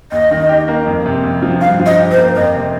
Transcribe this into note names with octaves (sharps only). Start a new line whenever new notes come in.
D#2 D#5
D#3
G4
A#3
F2
C3
F2
F3
G2 F5
F3
D#5
G4
C5
A#3
F2 D#5
C3